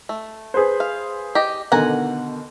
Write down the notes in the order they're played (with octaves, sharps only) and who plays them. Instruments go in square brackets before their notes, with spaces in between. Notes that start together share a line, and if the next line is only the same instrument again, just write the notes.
[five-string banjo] A3
[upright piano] G#4 B4 C5
[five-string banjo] F5
G4 D#5
[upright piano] B2 D3 D#3 [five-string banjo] F#5 G#5 A#5